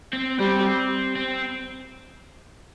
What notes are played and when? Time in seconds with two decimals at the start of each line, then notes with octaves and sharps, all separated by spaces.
0.13 C4
0.39 G3 C4
1.16 C4